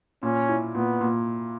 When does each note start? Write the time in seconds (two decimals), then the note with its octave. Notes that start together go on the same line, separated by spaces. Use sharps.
0.23 A#2 C#4
0.49 E4
0.75 A#2 B3
1.01 A#2